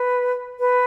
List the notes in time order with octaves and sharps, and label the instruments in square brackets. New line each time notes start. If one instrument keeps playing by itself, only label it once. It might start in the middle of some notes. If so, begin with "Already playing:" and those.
Already playing: [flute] B4
B4